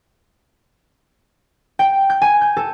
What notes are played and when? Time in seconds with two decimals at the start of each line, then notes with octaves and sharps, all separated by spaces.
1.79 G5
2.10 G6
2.22 G#5
2.41 G6
2.57 A4